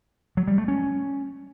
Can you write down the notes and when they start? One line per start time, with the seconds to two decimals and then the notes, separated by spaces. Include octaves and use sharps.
0.37 F#3
0.48 G3
0.58 A3
0.68 C#4